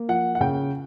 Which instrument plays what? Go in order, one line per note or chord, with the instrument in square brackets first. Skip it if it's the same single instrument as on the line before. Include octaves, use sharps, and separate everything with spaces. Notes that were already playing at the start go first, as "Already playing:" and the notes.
Already playing: [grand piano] A#3
F3 F#5
F#5
C#3 G5